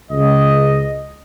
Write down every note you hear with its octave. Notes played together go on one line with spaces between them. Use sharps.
C#2 D#5